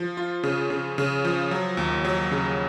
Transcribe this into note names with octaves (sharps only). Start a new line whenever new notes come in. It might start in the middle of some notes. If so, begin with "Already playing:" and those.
Already playing: F3
F4
C#3
C#3
C#3
F3
F#3
D#2
F#3
C#3